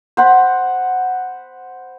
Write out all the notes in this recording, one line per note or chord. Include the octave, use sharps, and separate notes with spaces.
C5 F#5 B5